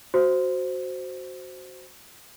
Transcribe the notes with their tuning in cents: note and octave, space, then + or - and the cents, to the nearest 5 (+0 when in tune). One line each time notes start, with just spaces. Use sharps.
F#4 +0 C5 +0